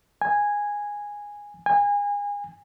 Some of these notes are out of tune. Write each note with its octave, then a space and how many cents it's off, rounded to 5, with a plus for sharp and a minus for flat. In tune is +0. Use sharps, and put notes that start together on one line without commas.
G#5 -10
G#5 -30